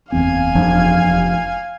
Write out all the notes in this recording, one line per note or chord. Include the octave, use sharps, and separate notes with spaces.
F#1 E2 C4 F5 G#5
F1 F3 D4